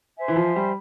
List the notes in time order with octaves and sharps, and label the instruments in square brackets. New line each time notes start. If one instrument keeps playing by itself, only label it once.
[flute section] C5 E5 G#5
[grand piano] E3
F3
G3